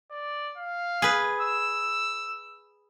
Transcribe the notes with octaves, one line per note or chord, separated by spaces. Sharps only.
D5
F5
G#4 B4
E6